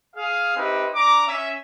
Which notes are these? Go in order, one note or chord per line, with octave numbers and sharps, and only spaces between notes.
G#4 F5
C4 D#4 E4 G4 B4
D4 A#5 D6
C#4 E5